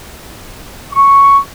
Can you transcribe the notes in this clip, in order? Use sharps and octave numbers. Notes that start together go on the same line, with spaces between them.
C#6